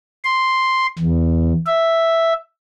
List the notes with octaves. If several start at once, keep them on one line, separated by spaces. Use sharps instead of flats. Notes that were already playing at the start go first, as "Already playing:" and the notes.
C6
E2
E5